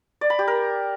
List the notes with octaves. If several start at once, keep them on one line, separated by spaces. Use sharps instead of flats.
D5
B5
G4
A#4